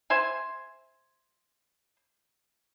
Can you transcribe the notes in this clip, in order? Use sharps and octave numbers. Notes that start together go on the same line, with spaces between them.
C5 E5 G#5